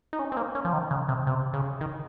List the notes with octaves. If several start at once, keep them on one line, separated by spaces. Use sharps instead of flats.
D#4
C#4
C4
A#3
C#4
F3
D#3
C#3
C3
C3
C#3
D#3